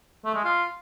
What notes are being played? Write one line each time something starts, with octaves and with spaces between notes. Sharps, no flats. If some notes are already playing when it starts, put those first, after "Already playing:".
A3
G#3
F4